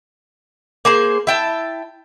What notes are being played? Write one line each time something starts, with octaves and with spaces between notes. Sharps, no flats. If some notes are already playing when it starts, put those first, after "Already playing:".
A#3 G#4 C5
E4 G5 A5